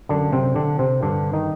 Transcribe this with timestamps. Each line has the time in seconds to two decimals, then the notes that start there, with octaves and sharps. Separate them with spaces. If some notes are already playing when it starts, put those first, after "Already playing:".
0.09 F#2 D3 D4
0.32 C3 C4
0.56 D3 D4
0.79 C3 C4
1.02 G2 D3 D4
1.33 D#3 D#4